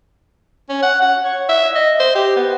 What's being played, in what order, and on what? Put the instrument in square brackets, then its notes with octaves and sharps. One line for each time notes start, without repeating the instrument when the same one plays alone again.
[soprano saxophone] C#4
F#5
F#5
C#5
E5
D#5
C5
G4
B3